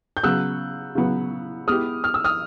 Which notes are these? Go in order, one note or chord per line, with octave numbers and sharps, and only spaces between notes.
G6
C#3 F#3 B3 E6 F#6
C#3 F#3 B3
G#3 B3 E4 G4 D#6 F6
F6
E6
D#6 F6